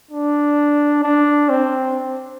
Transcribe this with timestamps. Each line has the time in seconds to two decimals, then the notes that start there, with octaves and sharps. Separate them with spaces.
0.11 D4
1.04 D4
1.50 C4